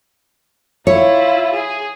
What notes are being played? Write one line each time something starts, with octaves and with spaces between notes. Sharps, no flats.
E4 F4 C#5
G#4